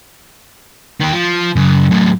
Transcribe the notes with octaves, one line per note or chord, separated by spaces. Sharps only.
D#3 G4
F3
F#2 C#3
F#2 A2